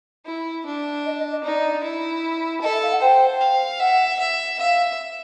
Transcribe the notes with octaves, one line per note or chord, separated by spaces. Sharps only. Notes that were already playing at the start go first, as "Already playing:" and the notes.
E4
D4
D#5
D#5
D#5
D#4 D5
E4
A4 D#5
E5
F5
F#5
C5 G5
F5
E5 F#5
E5
E5 F5